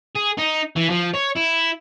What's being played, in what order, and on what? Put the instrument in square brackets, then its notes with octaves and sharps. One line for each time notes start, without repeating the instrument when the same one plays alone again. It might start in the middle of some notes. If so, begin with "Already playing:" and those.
[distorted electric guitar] G#4
D#4
E3
F3
C#5
E4